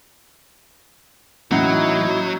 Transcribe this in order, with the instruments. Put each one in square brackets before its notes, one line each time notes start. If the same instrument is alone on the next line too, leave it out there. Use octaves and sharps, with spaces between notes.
[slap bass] A2 E3 A#3 [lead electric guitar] F#3 [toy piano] C#4 F#5 [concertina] D#4 E4